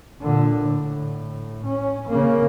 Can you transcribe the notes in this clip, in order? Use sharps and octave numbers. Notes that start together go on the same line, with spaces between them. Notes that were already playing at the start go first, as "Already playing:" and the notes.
A#2 D3
A2
C#4
C#3 A#3